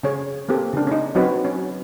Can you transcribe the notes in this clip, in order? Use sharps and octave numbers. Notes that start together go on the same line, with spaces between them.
C#3 C#4 G#4 C#5
A#3 C4 G4 A4
C#3 D4
C#4 D#4
F#3 C4 D#4 F#4 B4 C#5
C#4